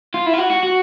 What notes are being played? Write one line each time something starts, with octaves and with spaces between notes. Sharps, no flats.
F4
E4
F4
F#4
F#4
F#4